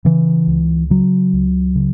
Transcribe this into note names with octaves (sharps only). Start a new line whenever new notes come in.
C#3 E3
C#2
C#3 F#3
C#2
C#3